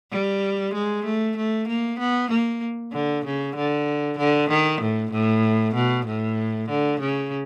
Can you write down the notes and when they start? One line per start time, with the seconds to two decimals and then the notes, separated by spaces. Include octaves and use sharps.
0.11 G3
0.74 G#3
1.05 A3
1.37 A3
1.68 A#3
1.99 B3
2.30 A#3
2.93 D3
3.25 C#3
3.56 D3
4.18 D3
4.50 D#3
4.82 A2
5.12 A2
5.75 B2
6.06 A2
6.69 D3
7.00 C#3